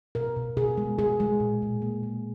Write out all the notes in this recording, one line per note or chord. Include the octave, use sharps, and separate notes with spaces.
B2 A#4
B2
B2 G#4
G#3
G#3 G#4
G#3
A#2
A#2
A#3
A#3